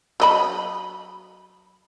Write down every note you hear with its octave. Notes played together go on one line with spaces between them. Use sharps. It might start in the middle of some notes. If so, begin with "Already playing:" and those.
F#3 D#5 B5